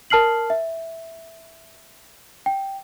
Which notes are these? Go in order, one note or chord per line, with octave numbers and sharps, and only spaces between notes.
A#4 A5 F6 C7 F#7
E5
G5